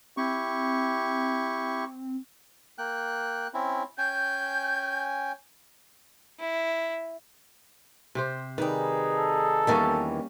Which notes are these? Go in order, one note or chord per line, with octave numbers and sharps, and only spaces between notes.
C4 E4 G4 C#6
A#3 G5 F#6
C4 C#4 E4
C#4 G5 G#5 G6
E4
C3 G4 C5
D#3 G3 D#4 G#4 B4
A4
E2 D#3 E3 G3 A#3 C#4